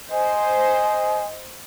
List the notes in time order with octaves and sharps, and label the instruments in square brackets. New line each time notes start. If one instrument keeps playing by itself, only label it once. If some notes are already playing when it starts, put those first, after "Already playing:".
[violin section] C5 [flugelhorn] D#5 [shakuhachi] G#5